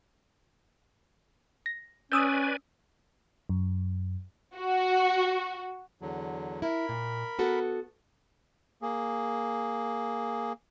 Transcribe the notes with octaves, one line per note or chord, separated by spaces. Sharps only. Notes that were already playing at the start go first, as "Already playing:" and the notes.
A#6
C#4 B4 D5 G#5 D#6 E6 G6
F#2
F#4
E2 D3 F#3
E4 A#4 B5
A#2
B3 F#4 A4
A#3 G#4